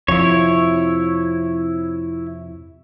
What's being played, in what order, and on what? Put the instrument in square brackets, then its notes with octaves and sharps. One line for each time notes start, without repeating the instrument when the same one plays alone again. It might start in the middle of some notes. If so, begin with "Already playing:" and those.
[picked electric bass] F2 C3 F3 [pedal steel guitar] E4 C#5